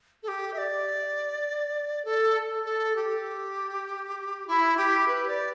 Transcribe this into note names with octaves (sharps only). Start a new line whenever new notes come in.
A4
G4
E5
D5
A4
A4
G4
E4
G4
B4
D5